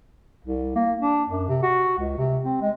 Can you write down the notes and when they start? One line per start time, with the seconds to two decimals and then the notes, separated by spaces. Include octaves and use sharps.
0.44 C2
0.76 A#3
1.01 D4
1.30 F#2
1.48 C3
1.63 F#4
1.98 C#2
2.18 C3
2.44 C4
2.62 G#3